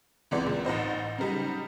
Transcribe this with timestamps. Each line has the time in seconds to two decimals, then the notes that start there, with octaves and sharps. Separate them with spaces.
0.31 C#2 C3 E3 G#3 B3 D5
0.46 A#2
0.65 A1 D#4 C5 D#5
1.18 C#3 F#3 G3 D#4